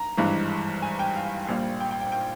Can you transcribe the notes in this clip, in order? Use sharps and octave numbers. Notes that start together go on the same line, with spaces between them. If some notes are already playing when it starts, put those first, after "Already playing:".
Already playing: A#5
G#1 G2 E3 G#3
G#5
G5
F5
A#1 A#2 G3 F5
G5
G5
G5
G5